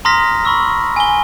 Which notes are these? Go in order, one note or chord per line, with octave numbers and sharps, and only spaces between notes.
A#5 C6 D#6 F6 A#6 B6
B5 C#6 E6
G#5 G7